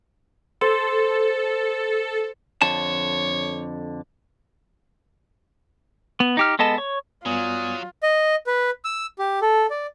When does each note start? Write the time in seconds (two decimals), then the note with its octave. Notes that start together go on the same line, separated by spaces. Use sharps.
0.61 A4 C5
2.62 F2 D3 C#5 A5
6.20 B3
6.37 D#4 G4 F6
6.59 G#3 B3 A4 D#5 A5
6.78 C#5
7.26 G2 F#3 B3 F4 D5 G#5 D#6
8.03 D#5
8.47 B4
8.85 E6
9.19 G4
9.42 A4
9.70 D5